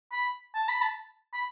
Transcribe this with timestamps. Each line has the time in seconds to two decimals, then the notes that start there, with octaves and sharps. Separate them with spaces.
0.12 B5
0.55 A5
0.68 B5
0.82 A5
1.33 B5